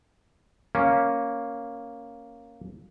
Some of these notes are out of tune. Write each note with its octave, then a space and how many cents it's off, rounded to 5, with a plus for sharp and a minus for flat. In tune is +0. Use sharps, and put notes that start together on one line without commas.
A#3 +0 C#4 +0